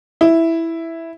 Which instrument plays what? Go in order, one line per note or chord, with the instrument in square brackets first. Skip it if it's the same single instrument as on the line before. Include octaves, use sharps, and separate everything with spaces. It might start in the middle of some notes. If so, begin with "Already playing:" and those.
[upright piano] E4